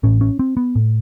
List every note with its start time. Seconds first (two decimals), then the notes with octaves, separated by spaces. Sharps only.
0.03 A1 A2 C#4
0.21 C#4
0.39 C4
0.57 B3
0.75 A2